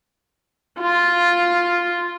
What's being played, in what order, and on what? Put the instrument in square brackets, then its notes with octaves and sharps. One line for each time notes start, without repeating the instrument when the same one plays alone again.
[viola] F4